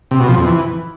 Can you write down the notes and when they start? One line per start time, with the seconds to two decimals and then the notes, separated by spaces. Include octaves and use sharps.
0.11 C3
0.20 B2
0.29 F3
0.37 F2
0.46 E3